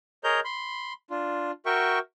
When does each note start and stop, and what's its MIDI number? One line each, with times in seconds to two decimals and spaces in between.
0.24 0.40 68
0.24 0.40 70
0.24 0.40 73
0.24 0.40 75
0.24 0.40 82
0.24 0.40 91
0.44 0.93 83
0.44 0.93 84
1.10 1.51 62
1.10 1.51 65
1.66 1.99 66
1.66 1.99 70
1.66 1.99 76
1.66 1.99 79
1.66 1.99 85